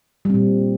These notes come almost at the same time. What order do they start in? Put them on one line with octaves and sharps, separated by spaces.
G3 C4 A#2